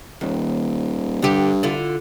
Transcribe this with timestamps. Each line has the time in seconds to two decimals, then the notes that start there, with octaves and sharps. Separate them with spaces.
0.21 D#1 D#2
1.22 G2 D3 G4
1.63 D3 E4 F4